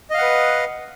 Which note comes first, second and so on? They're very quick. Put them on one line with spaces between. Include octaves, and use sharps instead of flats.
D#5 F5 F#5 B4